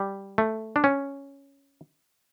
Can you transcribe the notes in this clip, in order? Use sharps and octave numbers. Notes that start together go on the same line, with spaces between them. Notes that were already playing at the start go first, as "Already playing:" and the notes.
Already playing: G3
A3
D4
C#4